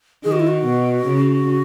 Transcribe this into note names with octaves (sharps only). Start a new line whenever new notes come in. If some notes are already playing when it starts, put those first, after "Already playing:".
D#3 G#4
F#4
E4
F#4
B2
C#3